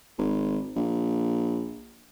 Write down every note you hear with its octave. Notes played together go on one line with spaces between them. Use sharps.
G#1
A#1